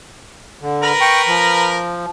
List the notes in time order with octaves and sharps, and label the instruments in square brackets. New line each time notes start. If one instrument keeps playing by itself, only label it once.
[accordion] D3
[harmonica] A#4 B4 A#5
[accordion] G5 C#6
F3